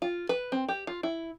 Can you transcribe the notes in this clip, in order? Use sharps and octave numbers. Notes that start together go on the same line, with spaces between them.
F4
B4
C4
G4
F4
E4